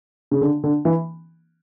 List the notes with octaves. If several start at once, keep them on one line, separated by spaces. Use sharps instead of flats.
C#3
D3
D3
E3